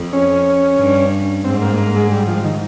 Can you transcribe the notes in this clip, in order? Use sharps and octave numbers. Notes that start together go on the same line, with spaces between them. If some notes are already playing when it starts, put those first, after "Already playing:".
Already playing: F2
C#4
G2
G#2 C4
A#3
A#3
G#3
G3
F3
D#3